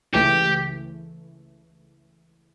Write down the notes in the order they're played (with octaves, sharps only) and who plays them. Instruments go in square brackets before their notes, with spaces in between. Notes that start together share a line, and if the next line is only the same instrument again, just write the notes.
[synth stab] C#2 C#3 E3 A3 [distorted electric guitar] G4